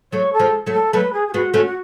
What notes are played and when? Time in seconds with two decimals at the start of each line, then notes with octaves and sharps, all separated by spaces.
0.12 F#3 A3 C#5
0.33 A4
0.39 F3 G#3
0.66 F#3 A3
0.73 A4
0.93 F#3 A3 B4
1.13 G#4
1.28 G#4
1.33 G#3 B3 F#4
1.54 A3 C#4 F#4
1.67 F#4